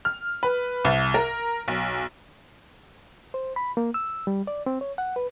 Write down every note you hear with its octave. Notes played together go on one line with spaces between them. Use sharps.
F6
B4
C2
A#4
B1
C5
B5
A#3
E6
G3
D5
C4
C#5
F#5
B4